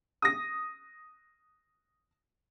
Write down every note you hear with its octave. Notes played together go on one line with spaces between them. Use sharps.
D#6 A#6